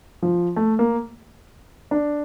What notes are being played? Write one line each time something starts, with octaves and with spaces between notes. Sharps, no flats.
F3
A3
A#3
D4